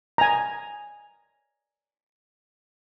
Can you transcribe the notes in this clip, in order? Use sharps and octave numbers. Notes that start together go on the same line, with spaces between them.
G#5 A#5